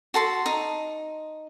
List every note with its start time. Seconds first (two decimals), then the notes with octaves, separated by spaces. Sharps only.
0.14 F#4 A4 C6
0.46 D#4